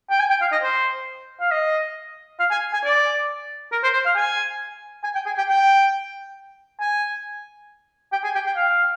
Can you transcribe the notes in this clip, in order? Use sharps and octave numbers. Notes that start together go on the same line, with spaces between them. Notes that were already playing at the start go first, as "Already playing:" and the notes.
G5
G#5
G5
F5
D#5
C5
F5
D#5
F5
G#5
G#5
D5
A#4
C5
C5
F5
G#5
G#5
G5
G#5
G5
G5
G#5
G5
G#5
G5
G5
F5